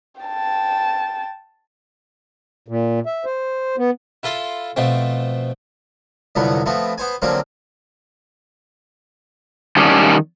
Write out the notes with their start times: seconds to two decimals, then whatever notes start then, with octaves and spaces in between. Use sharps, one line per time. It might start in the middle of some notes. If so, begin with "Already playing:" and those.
0.21 G5 A5
2.68 A#2
3.06 E5
3.25 C5
3.78 B3
4.23 E4 F4 A4 C6
4.76 B2 F3 A3 C4
6.35 C2 F2 D3 F#3 B3
6.66 F3 A3 B3 C4
6.98 B3 C5 G#5
7.22 D3 F3 F#3 A#3 C4 C#4
9.77 D#3 G3 C#4 D4